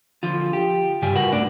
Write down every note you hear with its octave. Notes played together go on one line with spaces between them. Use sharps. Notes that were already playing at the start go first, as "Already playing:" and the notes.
D3 F3 F4
G4
G2 C#3 F4 G4 G#5
F#4 A#4 B4 F#5
C2 A3 D4 D5